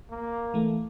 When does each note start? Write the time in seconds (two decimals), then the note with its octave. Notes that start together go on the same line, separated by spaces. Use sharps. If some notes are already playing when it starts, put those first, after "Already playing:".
0.10 A#3
0.54 E3 A3